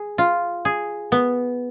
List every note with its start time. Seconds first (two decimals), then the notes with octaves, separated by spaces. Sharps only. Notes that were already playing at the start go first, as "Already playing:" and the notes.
Already playing: G#4
0.18 F4
0.65 G#4
1.12 B3